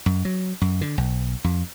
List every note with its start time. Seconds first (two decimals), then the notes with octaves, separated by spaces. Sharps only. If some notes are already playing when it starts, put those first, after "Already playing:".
0.06 F#2
0.25 F#3
0.61 F#2
0.81 D3
0.98 B1
1.44 F2